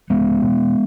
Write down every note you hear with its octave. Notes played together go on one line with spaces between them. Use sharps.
C#2 G#3 B3
B2